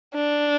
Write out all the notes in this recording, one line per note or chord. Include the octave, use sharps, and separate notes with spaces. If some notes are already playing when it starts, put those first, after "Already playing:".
D4